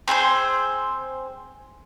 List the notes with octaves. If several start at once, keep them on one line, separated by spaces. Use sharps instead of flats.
C4 G#4 B4 C5